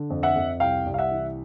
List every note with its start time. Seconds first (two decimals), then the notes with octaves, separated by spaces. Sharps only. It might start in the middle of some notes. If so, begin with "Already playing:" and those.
Already playing: D3
0.10 F2
0.23 E5 F#5
0.36 F2
0.60 C2 F5 G5
0.86 C2
0.94 F5
0.98 E5 F#5
1.11 E3